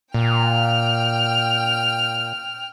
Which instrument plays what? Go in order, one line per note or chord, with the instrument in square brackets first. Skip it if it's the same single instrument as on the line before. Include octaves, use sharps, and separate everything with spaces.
[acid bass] A#2 [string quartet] G5 F6